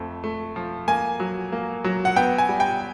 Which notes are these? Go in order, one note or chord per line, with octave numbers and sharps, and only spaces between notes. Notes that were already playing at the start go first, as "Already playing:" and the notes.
Already playing: F2 A3
A3
F3
A#3 G#5
F#3
A#3
F#3
F#5
B3 G5
G#5
G3
G5